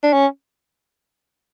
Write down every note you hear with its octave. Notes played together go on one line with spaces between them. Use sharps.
D4
C#4